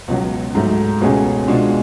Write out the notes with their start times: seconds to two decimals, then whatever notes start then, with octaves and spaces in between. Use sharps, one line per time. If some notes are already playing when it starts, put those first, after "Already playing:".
0.08 C#2 B2 F#3
0.55 G#2 F#3 A3
1.01 C#2 B2 A3 C#4 G#4
1.48 B2 G#3 D4 F4 G#4